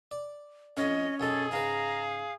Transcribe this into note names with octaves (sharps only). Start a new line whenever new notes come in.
D5
F2 A2 C#4 D#5
B1 F#2 D#4 G#4 A4
G#2 C#3 B4 F5 A#5